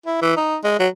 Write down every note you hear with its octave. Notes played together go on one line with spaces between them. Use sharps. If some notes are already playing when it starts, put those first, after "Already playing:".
E4
E3
D#4
G#3
F#3